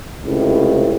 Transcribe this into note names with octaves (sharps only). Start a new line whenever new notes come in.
C#2 A2 C3